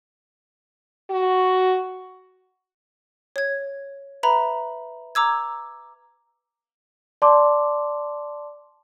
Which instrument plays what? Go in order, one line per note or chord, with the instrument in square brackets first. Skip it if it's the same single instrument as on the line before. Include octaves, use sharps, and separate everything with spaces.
[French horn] F#4
[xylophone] C#5 G#6
B4 E5 A#5 B5
A#5 D6 E6 G#6
[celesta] D5 A5 C6 D6